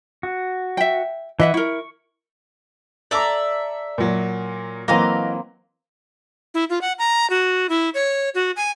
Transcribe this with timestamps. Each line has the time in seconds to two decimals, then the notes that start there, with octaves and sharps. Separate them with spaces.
0.23 F#4
0.77 E5 G5
1.40 E3 D#5 E5 F#5
1.54 E4 A#4 C#6
3.11 A4 D5 E5 A#5 D6
3.98 A#2 F#3
4.88 E3 F#3 A#3 C4 D#5 F5
6.54 E4
6.70 F4
6.81 F#5
6.99 A#5
7.30 F#4
7.69 E4
7.94 C#5
8.35 F#4
8.56 G#5